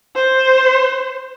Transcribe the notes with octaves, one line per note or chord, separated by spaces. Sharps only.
C5